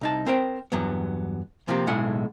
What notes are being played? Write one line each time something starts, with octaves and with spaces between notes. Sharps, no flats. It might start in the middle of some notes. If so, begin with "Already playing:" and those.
C2 D#4 A5
C4 A#4 C5 G5
E2 G2 F#3 B3
C3 F3 A#3 C4 E4 G4
B1 A2 C#3 G#3 F#5